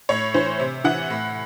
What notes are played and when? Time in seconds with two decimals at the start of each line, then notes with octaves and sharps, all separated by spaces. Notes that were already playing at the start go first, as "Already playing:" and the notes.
0.09 A2 C#5
0.34 E3 C5
0.59 C3
0.84 E3 F#5
1.10 A2